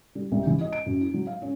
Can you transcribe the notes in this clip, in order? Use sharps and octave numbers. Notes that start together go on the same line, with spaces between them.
G3
C2
E3
D#5
D7
F#2
E4
F#3
F5
C#4